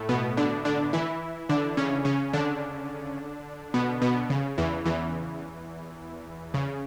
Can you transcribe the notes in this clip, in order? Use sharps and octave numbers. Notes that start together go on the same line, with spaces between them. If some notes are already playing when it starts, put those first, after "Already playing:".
Already playing: A2 A3
B2 B3
D3 D4
D3 D4
E3 E4
D3 D4
C#3 C#4
C#3 C#4
D3 D4
B2 B3
B2 B3
C#3
E2 E3
E2 E3
C#3